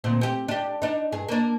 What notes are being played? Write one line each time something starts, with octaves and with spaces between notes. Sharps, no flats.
D2 A#2 C4
C4 G4
D4 G4
D4 D#4
G2 G#4
A#3 D4